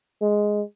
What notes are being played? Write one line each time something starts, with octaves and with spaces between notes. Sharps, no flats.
G#3